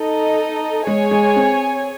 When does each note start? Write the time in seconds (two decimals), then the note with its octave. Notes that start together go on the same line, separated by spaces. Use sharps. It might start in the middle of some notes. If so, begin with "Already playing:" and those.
Already playing: D#4 A4 D#5
0.86 G#3 G#4 C#5 G#5
1.11 G#3
1.36 C4